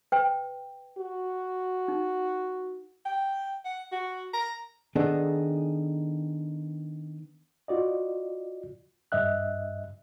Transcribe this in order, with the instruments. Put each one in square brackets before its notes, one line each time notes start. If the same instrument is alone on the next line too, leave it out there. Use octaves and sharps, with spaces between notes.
[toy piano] B4 G5
[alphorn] F#4
[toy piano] D#4
[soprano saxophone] G5
F#5
F#4
A#5
[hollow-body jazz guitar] D#3 B3 D4 D#4 G#4 A4
[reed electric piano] F4 F#4 D5 D#5
G2 D#5 E5 F#6